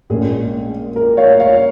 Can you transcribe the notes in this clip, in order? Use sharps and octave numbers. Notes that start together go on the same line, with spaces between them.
A#1 A#2 G#3 C#4 G#4
A#4
C#5 F5
C#5 F5